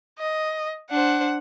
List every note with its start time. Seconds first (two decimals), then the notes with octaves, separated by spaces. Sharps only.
0.19 D#5
0.90 D4 C5 F#5